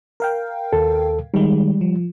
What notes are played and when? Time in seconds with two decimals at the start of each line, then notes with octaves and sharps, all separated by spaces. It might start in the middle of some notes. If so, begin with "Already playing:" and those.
0.20 A#4 F5 G5
0.73 D#2 A4
1.34 D#3 G3 G#3
1.81 F3